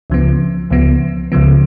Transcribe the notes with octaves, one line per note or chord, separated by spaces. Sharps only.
C#2 C#3 F3 B3
C#2 C#3 F3 B3
C#2 C#3 F3 B3